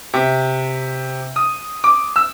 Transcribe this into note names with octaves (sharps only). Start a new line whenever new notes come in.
C3
D#6
D6
E6